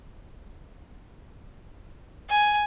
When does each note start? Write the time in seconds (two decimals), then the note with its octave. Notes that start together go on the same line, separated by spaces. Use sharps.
2.29 G#5